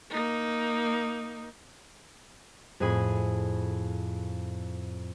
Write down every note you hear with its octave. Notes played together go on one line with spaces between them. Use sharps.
A#3 D#4
F2 A2 G#4 G#5 B5